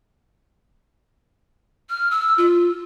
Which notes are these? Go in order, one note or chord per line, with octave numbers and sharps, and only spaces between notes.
F6
E6
F4